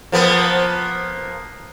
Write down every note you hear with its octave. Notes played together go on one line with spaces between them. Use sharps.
F3 A#3 B3